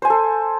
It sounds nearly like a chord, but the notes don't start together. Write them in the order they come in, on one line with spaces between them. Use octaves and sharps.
C5 G#5 C6 A4